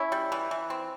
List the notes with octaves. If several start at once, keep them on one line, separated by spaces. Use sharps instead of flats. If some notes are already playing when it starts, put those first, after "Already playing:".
Already playing: C#4 E4
G3
E3
E3
C4